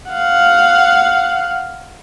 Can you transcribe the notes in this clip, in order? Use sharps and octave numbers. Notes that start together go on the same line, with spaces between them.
F5 F#5